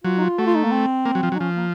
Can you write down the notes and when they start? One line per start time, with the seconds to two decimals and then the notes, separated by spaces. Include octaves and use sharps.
0.04 F#3 F4
0.18 D#4
0.21 F4
0.38 A3 F#4
0.47 F4
0.55 D#4
0.64 A#3
0.72 C4
1.05 A#3
1.15 F#3
1.23 F3
1.32 F#3
1.36 D#4
1.40 F3 C#4
1.56 A#3